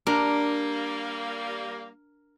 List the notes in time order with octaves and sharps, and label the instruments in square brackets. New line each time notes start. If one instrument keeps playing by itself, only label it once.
[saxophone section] G3 A#3 [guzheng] D4 [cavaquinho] A#4